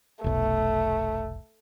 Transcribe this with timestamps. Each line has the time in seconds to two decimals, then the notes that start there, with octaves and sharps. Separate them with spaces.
0.24 F1 B1 A3